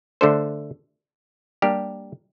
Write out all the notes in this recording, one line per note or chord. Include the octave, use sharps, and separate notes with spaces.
D3 A3 D4 A4 C5
G3 A#3 D4 G4 A#4